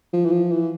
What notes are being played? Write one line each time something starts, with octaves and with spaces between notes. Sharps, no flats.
F3
E3
F3
E3